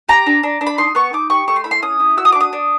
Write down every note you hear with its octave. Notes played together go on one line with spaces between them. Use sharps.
G4 A#5
D4
D4
D4
B5
D#4 C6
B3 C#6
D#4 D6
G4 C#6
A3 C#6
C6
E4 B5
C6
C#4 D#6
E4
F#4 E6
D#6
D6
D4
D#6
D4